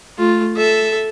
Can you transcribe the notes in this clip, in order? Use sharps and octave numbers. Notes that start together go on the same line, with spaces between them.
A3 F4
A4 E5